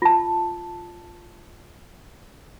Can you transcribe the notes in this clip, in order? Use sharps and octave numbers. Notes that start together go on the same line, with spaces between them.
F4 A5